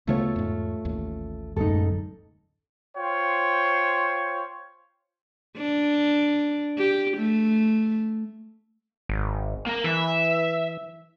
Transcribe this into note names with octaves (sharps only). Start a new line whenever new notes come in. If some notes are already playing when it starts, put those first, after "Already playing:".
D2 C#3 A3 B3 F4 C#5
E2 G#2
A1 D#2
D1 F#2 G#3 D#4 A4
F4 C5 C#5 G5
D4
G4
A3
G#1
A#3
E3 E5